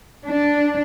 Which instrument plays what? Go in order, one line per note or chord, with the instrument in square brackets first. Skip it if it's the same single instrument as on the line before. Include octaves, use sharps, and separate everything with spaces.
[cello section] D4